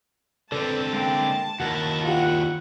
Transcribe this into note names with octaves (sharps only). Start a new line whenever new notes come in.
D3 C4 A4 B4 D5 A5
G#3 A#3 G5
D#2 E4 F#4 A#4 F#5
F4 G4 F#5